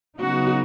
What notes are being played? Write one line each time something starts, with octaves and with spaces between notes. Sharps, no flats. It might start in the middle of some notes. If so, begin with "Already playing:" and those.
C#3 F#3 B3 D#4 F#4